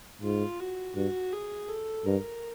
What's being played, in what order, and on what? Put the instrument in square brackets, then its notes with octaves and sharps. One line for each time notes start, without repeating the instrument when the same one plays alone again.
[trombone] G#2 [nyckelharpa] F4
[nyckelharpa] F#4
[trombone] G2 [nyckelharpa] F#4
[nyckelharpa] G#4
A4
[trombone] G2 [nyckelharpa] A#4